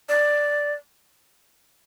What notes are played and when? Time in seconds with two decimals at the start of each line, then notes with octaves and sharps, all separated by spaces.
0.09 D5